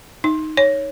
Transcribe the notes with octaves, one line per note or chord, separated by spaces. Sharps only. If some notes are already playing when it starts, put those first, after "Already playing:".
D#4
C#5